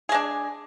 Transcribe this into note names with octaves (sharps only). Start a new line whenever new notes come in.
G#3 D4 G#4